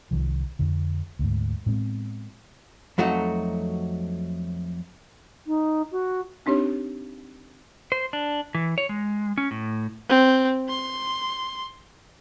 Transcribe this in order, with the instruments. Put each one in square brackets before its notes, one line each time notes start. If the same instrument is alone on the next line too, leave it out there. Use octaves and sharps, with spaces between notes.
[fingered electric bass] C2 D#3 F3
F2 D3
D2 G#2
A2 G#3 B3 C4
[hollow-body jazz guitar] F2 F#3 A3 D#4 F#4
[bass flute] D#4
F#4
[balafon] C4 D4 D#4 G4 C#5
[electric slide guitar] C5
D4
E3
C#5
G#3
C#4
A2
[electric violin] C4
C6